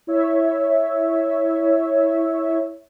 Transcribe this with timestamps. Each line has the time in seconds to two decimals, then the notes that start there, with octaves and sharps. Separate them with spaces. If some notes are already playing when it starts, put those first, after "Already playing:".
0.07 E4 C#5 E5